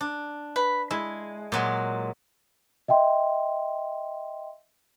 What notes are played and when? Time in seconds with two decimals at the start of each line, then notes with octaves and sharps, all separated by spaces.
0.01 D4
0.56 B4
0.91 G#3 E4
1.52 A#2 F#3 G#3
2.88 D#5 E5 G5 C6